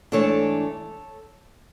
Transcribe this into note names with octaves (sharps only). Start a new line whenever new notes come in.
G#2 E3 A3 D4 A4 C#5